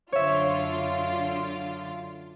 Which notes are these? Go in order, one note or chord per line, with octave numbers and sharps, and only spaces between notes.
F#2 D3 F4 C#5 E5